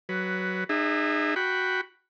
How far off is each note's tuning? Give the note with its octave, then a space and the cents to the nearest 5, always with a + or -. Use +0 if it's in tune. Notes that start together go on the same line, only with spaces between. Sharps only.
F#3 +10 B4 +0
D#4 -40 G#4 -20 E5 -5
F#4 +0 G5 +0 B5 +0